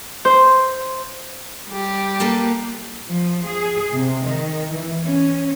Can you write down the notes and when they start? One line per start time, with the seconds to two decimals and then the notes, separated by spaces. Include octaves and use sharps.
0.25 C5
1.68 G3 G4
2.20 A#3 A4 B4
3.07 F3
3.46 G#4
3.95 C3
4.27 D#3
4.71 E3
5.05 C#4